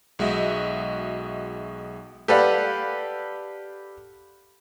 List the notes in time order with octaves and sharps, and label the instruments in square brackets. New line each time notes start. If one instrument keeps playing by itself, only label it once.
[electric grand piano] B1 G#3 F#4 D#5 E5
[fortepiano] G4 A4 B4 D5 F5 F#5